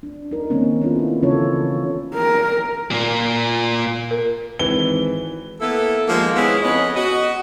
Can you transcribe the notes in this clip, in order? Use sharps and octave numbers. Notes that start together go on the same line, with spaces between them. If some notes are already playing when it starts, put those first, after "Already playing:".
D4
D#4 A#4
D#3 A#3 C4 C#4
B3 C#4 E4 F4 A4
E4
C#3 E3 C#4 F4 A4 C#5
A#4
A#2 A#3
A#4
G#1 E3 G7
A#3 B3 E4 A4
D#2 F3 G#3 A#3
G#3 B3 C#4 E4 G#4
F2 B3 C#4 B4 C#5 D#5
F#4 D#5